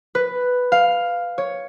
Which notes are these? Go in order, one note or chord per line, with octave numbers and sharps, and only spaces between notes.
B4
F5
C#5